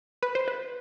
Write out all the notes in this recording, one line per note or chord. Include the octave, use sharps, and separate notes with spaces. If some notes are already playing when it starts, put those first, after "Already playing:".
B4
C5
B4